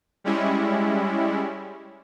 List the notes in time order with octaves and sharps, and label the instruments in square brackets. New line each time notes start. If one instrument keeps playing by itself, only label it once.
[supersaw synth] G3 G#3 C#4 E4